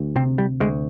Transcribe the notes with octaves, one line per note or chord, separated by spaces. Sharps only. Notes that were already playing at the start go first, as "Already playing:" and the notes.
Already playing: D2
C3 C4
G3
D2 G#3